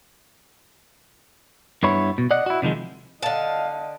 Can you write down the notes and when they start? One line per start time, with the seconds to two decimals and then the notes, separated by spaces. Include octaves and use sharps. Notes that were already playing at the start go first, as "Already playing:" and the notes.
1.83 G2 B3 E4 C#5 B5
2.18 B2
2.31 D5 D#5 F#5
2.46 E4 F#4
2.62 C3 D#3 F3 G#3
3.22 D3 D#5 F5 A5